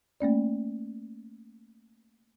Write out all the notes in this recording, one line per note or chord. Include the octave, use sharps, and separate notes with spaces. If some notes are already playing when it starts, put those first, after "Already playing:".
A3 A#3 C#4 D5